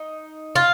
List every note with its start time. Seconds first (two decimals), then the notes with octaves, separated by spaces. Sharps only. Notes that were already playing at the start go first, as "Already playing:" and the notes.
Already playing: D#4
0.56 F4